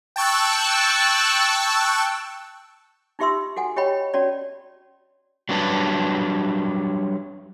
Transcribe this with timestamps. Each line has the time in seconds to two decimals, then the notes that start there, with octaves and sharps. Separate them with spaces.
0.16 G5 A5 C#6 E6 F#6
3.19 D#4 F4 G4 E5 C6 E6
3.57 F#4 A4 F#5 G#5
3.76 G4 C#5 D#5 F#5 G5 B5
4.14 C#4 F#4 C#5 D5
5.49 F#3 G3 D4 B4 A5